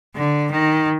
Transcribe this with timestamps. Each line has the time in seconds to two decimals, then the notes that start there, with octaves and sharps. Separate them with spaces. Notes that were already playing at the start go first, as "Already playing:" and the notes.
0.16 D3
0.51 D#3